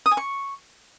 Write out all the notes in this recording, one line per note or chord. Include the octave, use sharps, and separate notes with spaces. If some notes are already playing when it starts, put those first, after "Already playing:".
D#6
G#5
C#6